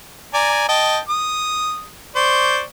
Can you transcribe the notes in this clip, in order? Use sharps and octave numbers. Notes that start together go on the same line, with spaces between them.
D5 G#5 A#5
D#5 G5 A5
D#6
C5 D5 C#6